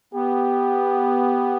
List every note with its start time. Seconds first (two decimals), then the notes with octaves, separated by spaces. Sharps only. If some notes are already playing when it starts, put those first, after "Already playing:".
0.14 B3 G4